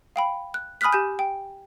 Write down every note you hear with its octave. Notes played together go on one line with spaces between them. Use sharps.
F5 G5 B5
F#6
G#5 B5 D#6 F6 F#6 B6
G4 G#5 G6
G5